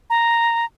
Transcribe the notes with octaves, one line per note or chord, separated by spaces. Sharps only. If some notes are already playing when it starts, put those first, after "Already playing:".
A#5